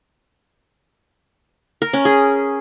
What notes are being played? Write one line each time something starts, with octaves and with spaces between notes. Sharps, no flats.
A#4
C#4
G#4